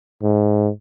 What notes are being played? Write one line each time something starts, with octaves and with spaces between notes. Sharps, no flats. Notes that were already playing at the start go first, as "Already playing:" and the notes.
G#2